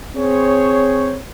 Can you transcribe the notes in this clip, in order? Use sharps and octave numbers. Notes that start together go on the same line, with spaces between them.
C4 G#4 C5 C#5